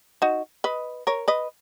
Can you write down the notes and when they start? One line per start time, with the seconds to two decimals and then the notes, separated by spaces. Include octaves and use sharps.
0.22 D#4 F#4
0.64 B4 D#5
1.07 A#4 C#5
1.28 B4 D#5